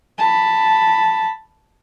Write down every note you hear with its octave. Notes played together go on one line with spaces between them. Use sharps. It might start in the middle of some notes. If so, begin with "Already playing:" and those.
A5 B5